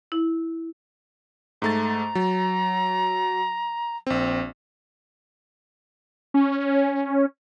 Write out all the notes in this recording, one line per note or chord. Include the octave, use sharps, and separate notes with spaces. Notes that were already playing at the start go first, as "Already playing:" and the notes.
E4
G#2 A3 A#5 A6
F#3
A#1 C4
C#4